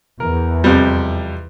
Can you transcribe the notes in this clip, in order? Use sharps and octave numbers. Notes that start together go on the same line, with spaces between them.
E2 A#4
F2 C3 G3